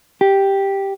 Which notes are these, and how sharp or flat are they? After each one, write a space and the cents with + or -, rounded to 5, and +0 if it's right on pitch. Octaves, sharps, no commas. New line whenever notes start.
G4 +0